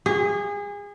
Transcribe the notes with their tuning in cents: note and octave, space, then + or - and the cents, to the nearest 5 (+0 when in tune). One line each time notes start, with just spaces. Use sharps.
G#4 -30